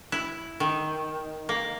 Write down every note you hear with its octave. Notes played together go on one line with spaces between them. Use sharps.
E4
D#3
A#3